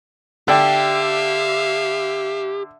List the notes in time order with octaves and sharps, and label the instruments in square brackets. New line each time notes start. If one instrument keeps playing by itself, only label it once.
[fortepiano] D3 [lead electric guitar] G4 [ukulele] D5 G5 [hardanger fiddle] E5 F5